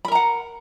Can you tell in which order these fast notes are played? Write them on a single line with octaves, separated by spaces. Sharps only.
B5 A#4 A#5 F#5